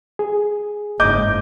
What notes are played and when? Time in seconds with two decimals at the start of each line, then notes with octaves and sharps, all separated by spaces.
0.19 G#4
1.00 F#1 G#2 D#5 D6 G6